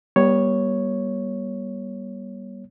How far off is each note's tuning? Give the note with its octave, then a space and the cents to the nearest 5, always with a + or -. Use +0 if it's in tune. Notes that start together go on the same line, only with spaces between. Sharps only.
G3 +0 B3 -40 C#5 +0